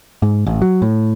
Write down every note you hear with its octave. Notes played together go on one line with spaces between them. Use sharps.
G#2
A1
F#3
A2